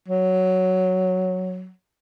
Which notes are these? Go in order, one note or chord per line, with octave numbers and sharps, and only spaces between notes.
F#3